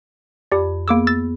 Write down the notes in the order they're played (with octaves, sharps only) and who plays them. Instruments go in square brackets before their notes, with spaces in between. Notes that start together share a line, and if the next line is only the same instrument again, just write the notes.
[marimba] F2 B5 [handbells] G4 D5
[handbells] A#3 D6 E6 [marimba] B3 G#4
[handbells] E6 A6